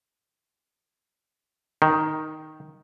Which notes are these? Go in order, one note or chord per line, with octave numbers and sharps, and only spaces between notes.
D#3